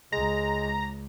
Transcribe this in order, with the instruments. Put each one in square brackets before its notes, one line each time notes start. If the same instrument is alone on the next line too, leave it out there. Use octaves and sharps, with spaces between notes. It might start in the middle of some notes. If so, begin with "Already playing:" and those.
[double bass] C#2 [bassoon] G#3 [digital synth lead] A#5